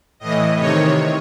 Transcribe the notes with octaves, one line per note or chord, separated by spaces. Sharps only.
A2 E3 D#5
C3 D#3 C#5